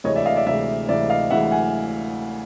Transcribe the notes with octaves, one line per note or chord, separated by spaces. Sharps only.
D2 C3 E3 G#3 C#5 D#5
D5 E5
D#5 F5
D5 E5
D2 C3 E3 G#3 D5 E5
D2 C3 E3 G#3 D5 E5
D#5 F5
D2 C3 E3 G#3 E5 F#5
F#5 G#5